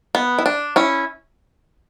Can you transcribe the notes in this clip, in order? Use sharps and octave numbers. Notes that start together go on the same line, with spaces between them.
B3
E4
D4
C#4 E4